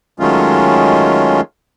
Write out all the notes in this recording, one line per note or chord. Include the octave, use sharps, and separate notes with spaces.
D#3 F#3 G#3 A3 C#4 F4